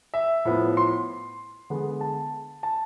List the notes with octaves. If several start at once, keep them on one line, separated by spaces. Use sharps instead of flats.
E5
A2 F3 B3
C6
D3 G#3 B3
A5
A5